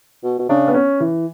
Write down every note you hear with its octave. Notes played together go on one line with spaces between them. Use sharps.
B2
B2
C#3 D4
B3
C#4
E3